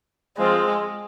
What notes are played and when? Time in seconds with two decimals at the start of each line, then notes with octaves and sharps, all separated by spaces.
0.37 F3 G#3 C4 F4